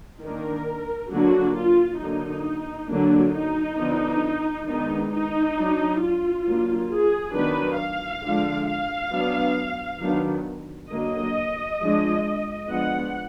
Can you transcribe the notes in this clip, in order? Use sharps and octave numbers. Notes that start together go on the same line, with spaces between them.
D#3 A#3 D4 A#4
D3 F#3 A#3 D4 F#4
F4
D3 F#3 A#3 D4 D#4
D3 F#3 A#3 D4
D#4
D3 F3 B3 D4
D#3 G#3 B3 D4 D#4
D#4
F#3 D4
F4
F#3 A#3 D4
G#4
D#3 F#3 B3 D4 B4
F5
D3 F3 G#3 D4
F5
F#3 B3 D4
D#3 F#3 B3 D4
D3 F#3 A#3 D#5
F3 G#3 D4
F3 G#3 B3 D4 F#5